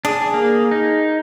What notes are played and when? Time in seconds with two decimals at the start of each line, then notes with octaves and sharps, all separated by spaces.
0.05 D4 G#4
0.34 A#3
0.71 D#4